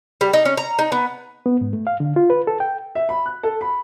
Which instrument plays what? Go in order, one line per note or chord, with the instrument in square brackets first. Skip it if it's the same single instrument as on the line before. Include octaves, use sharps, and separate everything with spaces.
[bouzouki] G3
D#4
C#4
A#5
D#4
B3
[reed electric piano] B3
G#2
A3
F5
D3
F4
B4
A4
G5
[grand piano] E5
B5
F#6
A4
B5